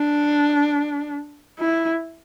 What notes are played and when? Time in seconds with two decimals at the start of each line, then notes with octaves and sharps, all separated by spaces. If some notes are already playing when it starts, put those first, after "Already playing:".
Already playing: D4
1.60 E4